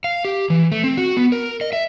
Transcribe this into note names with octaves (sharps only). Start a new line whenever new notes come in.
F5
G4
E3
A3
C4
F#4
B3
A#4
D#5
E5